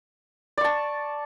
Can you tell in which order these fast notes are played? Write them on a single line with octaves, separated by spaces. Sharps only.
D5 C#6 A5